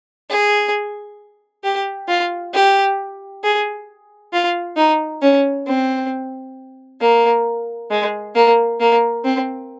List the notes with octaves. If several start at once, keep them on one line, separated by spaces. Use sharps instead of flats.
G#4
G4
F4
G4
G#4
F4
D#4
C#4
C4
A#3
G#3
A#3
A#3
C4